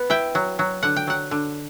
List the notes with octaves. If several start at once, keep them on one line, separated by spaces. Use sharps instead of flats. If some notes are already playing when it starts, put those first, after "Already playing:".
Already playing: B3
E4 G5
F#3
F#3
D3 F#5
G5
F#3 F#5
D3